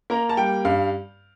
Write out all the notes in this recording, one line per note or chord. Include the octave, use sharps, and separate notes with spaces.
A#3 A#5
A5
G3 G5
G2 F5